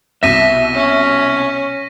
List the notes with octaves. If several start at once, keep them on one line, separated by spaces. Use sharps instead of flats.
C2 B2 E5 A#6 B6 D#7
C#4